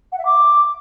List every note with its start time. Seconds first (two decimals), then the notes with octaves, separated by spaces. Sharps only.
0.12 F#5
0.18 E5
0.25 D6